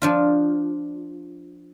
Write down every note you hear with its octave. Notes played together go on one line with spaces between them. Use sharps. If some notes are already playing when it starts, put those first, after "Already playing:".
F3 D4 F4